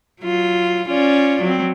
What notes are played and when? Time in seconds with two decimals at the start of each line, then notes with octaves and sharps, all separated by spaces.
0.21 F#3 F4
0.88 C#4 F4 D5
1.42 F#3 C4